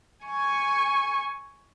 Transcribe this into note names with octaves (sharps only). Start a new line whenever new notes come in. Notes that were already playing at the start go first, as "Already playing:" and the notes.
G#5 C#6